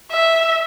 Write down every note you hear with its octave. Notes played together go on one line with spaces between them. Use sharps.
E5